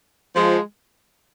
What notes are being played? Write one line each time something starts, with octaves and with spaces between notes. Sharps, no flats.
F3 G#3